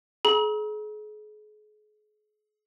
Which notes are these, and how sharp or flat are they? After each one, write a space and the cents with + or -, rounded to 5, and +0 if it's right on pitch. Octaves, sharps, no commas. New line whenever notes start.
G#4 +40 A#5 +40